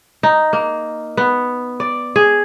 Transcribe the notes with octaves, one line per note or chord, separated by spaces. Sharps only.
D#4
A#3
B3
D5
G#4